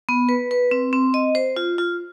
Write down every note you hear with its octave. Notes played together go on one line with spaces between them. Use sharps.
B3
B4
B4
C4
C4
D#5
C5
F4
F4